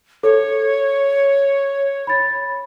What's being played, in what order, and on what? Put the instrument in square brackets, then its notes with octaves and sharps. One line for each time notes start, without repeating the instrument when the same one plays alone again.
[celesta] A4 [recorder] C#5
[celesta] B5 A6